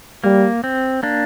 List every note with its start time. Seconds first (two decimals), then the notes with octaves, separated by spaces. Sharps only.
0.24 G3 A#3
0.64 C4
1.03 A#3 D4